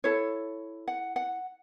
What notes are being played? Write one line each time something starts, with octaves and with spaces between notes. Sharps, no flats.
E4 A4 C#5
F#5
F#5